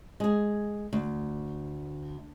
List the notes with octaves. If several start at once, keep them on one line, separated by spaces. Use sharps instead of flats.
G#3 G#4
D2